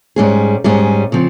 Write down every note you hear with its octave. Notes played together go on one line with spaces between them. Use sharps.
G#2 G3 C#4 G#4
G#2 G3 C#4 G#4
C#3 F3 C4